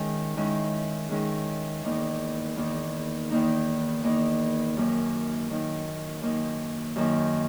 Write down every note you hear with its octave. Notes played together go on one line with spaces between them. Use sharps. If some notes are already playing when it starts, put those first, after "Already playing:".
Already playing: D#3 G#3 C#4 E4
D#3 G#3 C#4 E4
D#3 G#3 C#4 E4
E2 D#3 A#3 D#4
E2 D#3 A#3 D#4
E2 D#3 A#3 D#4
E2 D#3 A#3 D#4
F#2 D#3 A#3 D#4
F#2 D#3 A#3 D#4
F#2 D#3 A#3 D#4
F#2 D#3 A#3 D#4